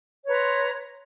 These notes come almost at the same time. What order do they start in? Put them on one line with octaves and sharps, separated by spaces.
C#5 B4 A#5 C6